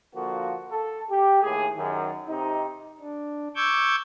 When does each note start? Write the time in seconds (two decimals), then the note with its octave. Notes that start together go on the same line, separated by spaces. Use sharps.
0.15 D3 F3 A#3 F#4
0.71 A4
1.09 G4
1.42 D#2 A2 G#4
1.76 F#2 D#3
2.28 C3 D#4
3.01 D4
3.56 C#6 D6 E6 G6 G#6